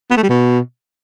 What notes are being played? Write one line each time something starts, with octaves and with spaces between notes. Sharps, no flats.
B3
A3
G3
B2